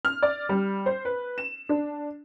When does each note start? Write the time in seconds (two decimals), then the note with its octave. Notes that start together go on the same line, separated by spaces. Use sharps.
0.05 F6
0.23 D5
0.49 G3
0.86 C5
1.05 B4
1.38 E7
1.69 D4